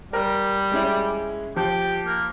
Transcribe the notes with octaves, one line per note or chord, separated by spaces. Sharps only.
G3 A#4
G#3 C#4 E4
F3 G4
A#3